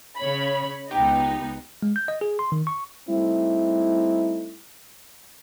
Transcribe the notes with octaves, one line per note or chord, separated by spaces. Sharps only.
C#3 C#5 B5
C#2 B3 D#4 G4
G#3
G6
D#5
G#4
C6
D#3
C#6
G3 A3 C4 D#4 E4